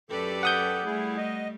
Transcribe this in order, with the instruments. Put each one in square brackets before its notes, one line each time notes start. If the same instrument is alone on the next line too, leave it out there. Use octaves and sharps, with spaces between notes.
[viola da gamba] F#2 B4 D5 [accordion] G4 A4
[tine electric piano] F#5 D#6 G6
[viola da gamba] G3 A3 [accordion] E4 G#4
[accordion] D#5